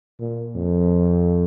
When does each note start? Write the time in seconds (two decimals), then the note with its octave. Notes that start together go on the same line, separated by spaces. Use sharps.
0.20 A#2
0.55 F2